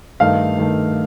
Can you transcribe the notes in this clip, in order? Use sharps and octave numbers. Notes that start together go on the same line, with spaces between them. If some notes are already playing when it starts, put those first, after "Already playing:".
G2 D#3 A3 D#4 F5
G2 D#3 A3 D#4